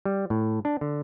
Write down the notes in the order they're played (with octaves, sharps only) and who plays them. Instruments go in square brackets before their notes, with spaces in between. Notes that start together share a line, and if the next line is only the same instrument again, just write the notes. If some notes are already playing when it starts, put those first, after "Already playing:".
[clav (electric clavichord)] G3
A2
D4
D3